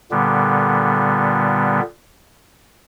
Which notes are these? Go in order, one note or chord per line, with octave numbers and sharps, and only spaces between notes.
A#2 D3 G3 B3